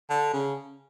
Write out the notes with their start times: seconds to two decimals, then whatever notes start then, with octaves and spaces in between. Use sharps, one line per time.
0.10 D3
0.33 C#3